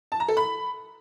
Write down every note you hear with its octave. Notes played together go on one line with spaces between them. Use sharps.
A5
A#5
A4
B5